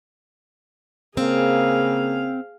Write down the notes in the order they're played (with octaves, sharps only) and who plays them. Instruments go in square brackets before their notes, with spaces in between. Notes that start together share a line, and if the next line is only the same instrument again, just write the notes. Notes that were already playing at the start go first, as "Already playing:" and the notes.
[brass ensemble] C#3 A#3 [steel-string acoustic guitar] C4 [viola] G#4 F5